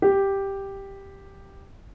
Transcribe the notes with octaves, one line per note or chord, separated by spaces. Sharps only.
G4